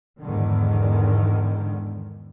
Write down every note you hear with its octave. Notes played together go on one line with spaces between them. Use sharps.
E2 G#2 D3 D#3